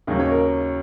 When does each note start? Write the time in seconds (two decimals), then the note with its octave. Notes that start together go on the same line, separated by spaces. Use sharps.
0.07 D#2 C#3 F#3 D#4
0.20 C#5
0.31 A#4